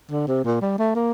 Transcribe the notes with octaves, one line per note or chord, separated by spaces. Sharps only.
D3
C3
A#2
G3
A3
A#3